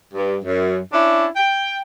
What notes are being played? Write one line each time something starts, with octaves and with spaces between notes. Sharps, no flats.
G2
F#2
C#4 D4 E4
G5